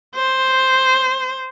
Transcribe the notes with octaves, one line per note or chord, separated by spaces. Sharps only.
C5